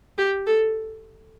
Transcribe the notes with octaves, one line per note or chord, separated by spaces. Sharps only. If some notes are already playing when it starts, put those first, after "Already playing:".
G4
A4